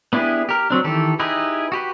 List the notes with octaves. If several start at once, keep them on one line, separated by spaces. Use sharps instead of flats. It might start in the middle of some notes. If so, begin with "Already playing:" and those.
B3 D4 E4 G4 G#4
G4 A#4
F#3 C4 D4
D#3 E3 G4 A4
D#4 E4 G4 G#4 B4
F#4 G4 B4